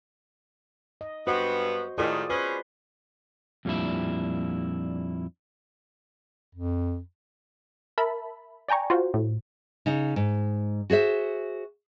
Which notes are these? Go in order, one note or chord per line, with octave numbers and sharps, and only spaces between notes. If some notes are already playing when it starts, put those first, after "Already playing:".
D#5
G2 B3 F#4 C5 D#5
A2 D#3 F4 G#4 D5
C#4 G#4 B4 C5
F2 A#2 G3 A#3 D4 E4
F2
A#4 E5 A5 B5
D5 G5 G#5 A#5 C#6
F4 F#4 C5
A2
C#3 D#4
G#2
F#4 G#4 C5 E5